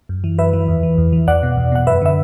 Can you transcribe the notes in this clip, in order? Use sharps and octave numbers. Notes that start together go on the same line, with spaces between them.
F#2
E3
F#2 B4 E5
E3
E2
E3
E2
E3
E2 D5 F#5
B2
E2
B2 F#5
F#2 B4 E5
D3 E5